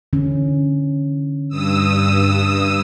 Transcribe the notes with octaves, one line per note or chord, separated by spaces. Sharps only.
D3 E3 C#4
G2 D#6 E6